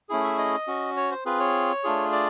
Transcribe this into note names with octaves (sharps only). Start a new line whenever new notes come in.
A3 C#4 E4 G#4
E5
D#5
C#4 F#4
C#5
C5
C4 F4 G#4 B4
C#5
A3 D4 F4 G#4
D5